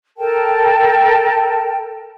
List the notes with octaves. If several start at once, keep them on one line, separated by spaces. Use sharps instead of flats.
A4 A#4 G5 A5